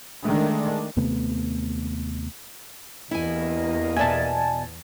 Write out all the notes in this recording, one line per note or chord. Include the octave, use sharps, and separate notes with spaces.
D#3 G#3 A3 D4
D#2 C3 A3 B3
E2 G2 A#3 E4 D#5 G#5
B2 D5 E5 G#5 A5